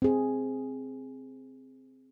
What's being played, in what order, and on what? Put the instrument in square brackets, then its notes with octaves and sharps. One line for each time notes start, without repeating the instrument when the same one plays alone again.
[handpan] C4 G#4